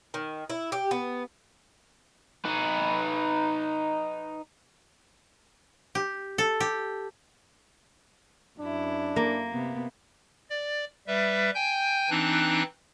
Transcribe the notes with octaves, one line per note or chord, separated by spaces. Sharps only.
D#3
E4
G4
B3
D#4 B4
G4
A4
G4
F#2 D4 E4
A#3
C3 B3
D5
G3 B4 E5
G5 G#5 G6
E3 C4 D4 D#4 F#6